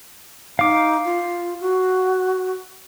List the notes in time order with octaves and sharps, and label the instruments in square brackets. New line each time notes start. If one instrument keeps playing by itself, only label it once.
[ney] D#4 [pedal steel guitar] F5 D6
[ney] F4
F#4